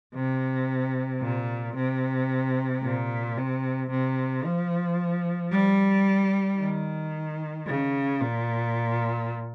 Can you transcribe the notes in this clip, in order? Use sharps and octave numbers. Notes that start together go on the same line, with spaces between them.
C3
A#2
C3
A#2
C3
C3
F3
G3
D#3
C#3
A#2